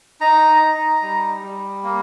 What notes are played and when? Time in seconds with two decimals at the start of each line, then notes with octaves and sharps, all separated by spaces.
0.21 D#4 A#5
0.61 D#4
1.01 G3
1.43 G3
1.83 A#3